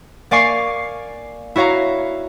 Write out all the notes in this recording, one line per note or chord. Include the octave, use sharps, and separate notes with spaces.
A#3 D5 F5 G#5 C#6 C7
E4 F#4 C#5 F5 A#5